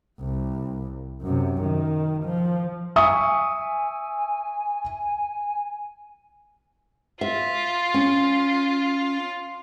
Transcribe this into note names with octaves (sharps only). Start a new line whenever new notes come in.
C2
F#2 C3
D#3
F3
E5 G#5 C#6 D#6
F4 E5
C#4